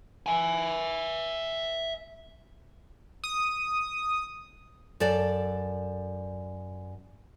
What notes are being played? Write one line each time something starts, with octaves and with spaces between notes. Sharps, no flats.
E5 G#5
D#6
F#2 A4 D5